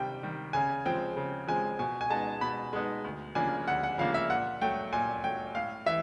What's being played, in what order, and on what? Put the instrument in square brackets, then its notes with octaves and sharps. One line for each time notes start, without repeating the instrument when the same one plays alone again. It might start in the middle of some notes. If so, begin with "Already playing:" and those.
Already playing: [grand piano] C3 D#3 G3 G5
D#3 G3
C#3 G#5
F3 G#3 C4 G5
C#3
F3 G#3 C4 G#5
B2 G#5
G#5
G#3 B3 D#4 A5
B2 B5
G#3 B3 D#4
D2
C#3 F3 A#3 D4 G#5
D2 F#5
F#5
C#3 F3 A#3 D4 F5
E5
A#2 F#5
F#3 A3 G5
A#2 G#5
F#3 A3 G5
A2 F5
E3 E5